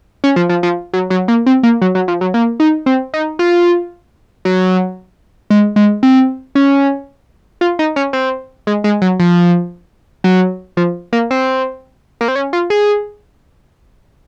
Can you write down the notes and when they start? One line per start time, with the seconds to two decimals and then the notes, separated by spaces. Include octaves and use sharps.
0.24 C#4
0.36 F3
0.49 F3
0.63 F3
0.93 F#3
1.10 F#3
1.28 A#3
1.46 C4
1.63 A#3
1.82 F#3
1.95 F#3
2.08 F3
2.21 F#3
2.34 A#3
2.60 D#4
2.86 C4
3.14 D#4
3.39 F4
4.45 F#3
5.50 G#3
5.76 G#3
6.03 C4
6.55 C#4
7.61 F4
7.79 D#4
7.96 C#4
8.13 C4
8.67 G#3
8.84 G#3
9.02 F#3
9.19 F3
10.24 F#3
10.77 F3
11.13 A#3
11.31 C4
12.21 A#3
12.28 C4
12.36 C#4
12.53 F4
12.70 G#4